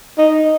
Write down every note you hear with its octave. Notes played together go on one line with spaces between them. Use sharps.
D#4